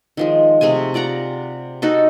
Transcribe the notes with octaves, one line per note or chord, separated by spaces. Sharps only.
D#3 F3 G#3
C3 A3 G#4 G#5
F4 D5 F#5 A#5
D#4 F#4 A4